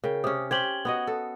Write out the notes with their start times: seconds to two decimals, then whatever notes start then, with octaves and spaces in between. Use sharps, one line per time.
0.04 C#3 A#4 G5
0.24 C3 C#4 C5 D6 D#6
0.51 C#4 G4 C5 G#6 F#7 G7
0.85 B3 F#4 D#5
1.07 A4